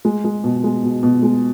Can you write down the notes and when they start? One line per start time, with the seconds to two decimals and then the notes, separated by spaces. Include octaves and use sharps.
0.05 G#3
0.24 G#3
0.44 B2
0.64 G#3
0.83 B2
1.03 B2
1.23 G#3